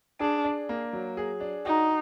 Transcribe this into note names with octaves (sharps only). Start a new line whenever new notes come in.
D4 G#4
D4
A#3
F#3
G#4
D4
D#4 F#4